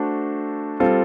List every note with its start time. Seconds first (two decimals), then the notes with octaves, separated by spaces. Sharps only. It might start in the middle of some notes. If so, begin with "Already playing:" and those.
Already playing: A3 D4 F#4 A4 C5
0.80 G3 C4 F4 A4